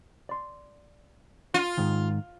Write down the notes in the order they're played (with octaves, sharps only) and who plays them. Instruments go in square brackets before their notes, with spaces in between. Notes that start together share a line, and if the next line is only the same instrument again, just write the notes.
[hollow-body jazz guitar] D5 C6
[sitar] F4
[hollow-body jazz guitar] G#2 D#3